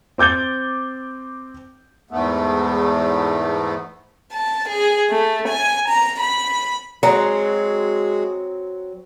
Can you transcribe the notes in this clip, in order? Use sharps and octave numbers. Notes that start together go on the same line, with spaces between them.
C4 D6 G6 A6 G7
E2 G#2 A3 B3
A5
G#4
A3
G#5
A#5
B5
F#3 G#3 C4 F#4 G#4 A#5